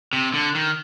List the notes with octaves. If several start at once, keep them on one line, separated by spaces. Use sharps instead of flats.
C3
D3
D#3